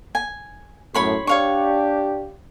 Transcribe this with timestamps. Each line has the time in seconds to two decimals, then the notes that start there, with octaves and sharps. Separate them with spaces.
0.15 G#5
0.94 F#2 A2 C#5 B5 C6
1.27 D4 G4 C#5 F5 C#6